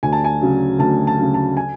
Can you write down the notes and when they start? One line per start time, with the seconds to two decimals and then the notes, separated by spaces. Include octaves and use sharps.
0.03 D2 G#5
0.12 A5
0.24 G#5
0.41 C#3 F#3
0.79 D2 A5
1.07 A5
1.17 C#3 F#3
1.34 A5
1.57 G#5